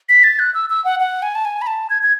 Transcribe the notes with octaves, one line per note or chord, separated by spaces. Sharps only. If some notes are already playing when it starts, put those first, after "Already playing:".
B6
A6
F#6
E6
E6
F#5
F#5
G#5
A5
G#5
B5
A5
G#6
G#6